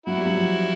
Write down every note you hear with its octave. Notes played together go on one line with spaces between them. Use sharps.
F#3 E4 F#4
G3
F#3
F3